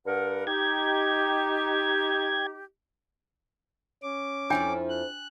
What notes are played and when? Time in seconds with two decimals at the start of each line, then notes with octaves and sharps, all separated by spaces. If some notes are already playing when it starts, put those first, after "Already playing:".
0.06 G2 A#4 F#5
0.47 D#4 G4 G5 G#6
4.03 C#4 D6
4.50 F2 F3 D4 E4 G5 G#5
4.89 F#6